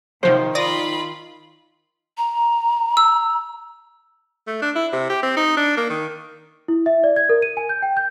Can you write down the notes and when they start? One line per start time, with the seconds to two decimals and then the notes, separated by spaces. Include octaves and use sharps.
0.23 C3 D#3 F3 F#3 C5
0.55 F4 D5 B5 D#6 A#6
2.18 A#5
2.97 E6
4.47 A3
4.62 D4
4.76 E4
4.93 C3
5.10 G4
5.23 C4
5.36 D#4
5.57 D4
5.77 A#3
5.90 D#3
6.68 E4
6.86 E5
7.04 D5
7.16 G#6
7.29 A#4
7.42 D#7
7.57 G#5
7.69 G6
7.82 G5
7.97 G6